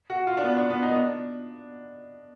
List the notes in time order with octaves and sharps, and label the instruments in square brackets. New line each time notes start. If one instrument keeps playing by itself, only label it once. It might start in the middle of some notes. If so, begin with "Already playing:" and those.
[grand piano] F#4
F4
D4
B3
D4
B3
D#4
B3
D4